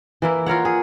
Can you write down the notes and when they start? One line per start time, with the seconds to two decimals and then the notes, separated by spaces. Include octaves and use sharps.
0.22 E3 A#3 E4
0.46 F4 A#4 C#5 F#5
0.65 G#4